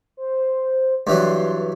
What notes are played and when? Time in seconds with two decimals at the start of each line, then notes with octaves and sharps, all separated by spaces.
0.17 C5
1.07 G2 E3 F#3 C6